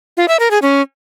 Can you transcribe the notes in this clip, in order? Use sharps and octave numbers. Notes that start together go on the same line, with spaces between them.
F4
E5
A#4
G#4
C#4